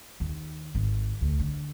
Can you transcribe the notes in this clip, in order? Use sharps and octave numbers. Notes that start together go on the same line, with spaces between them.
D#2
G#1
D2
D3